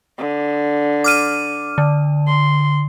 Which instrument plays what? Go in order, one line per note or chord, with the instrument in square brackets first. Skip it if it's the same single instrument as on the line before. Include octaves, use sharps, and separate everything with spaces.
[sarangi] D3
[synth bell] D6 F6 D#7
D3
[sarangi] C6